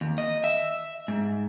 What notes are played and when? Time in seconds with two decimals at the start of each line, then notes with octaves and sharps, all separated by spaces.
0.01 D#2
0.18 D#5
0.44 E5
1.08 G#2